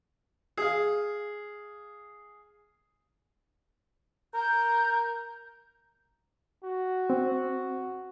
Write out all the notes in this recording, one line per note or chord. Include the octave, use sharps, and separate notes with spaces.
G#4 F5
A#4 G6
F#4
C4